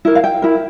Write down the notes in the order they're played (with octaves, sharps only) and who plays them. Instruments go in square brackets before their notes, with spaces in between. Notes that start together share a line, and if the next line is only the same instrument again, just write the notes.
[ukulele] E4 A#4
F5
G5
E4 A#4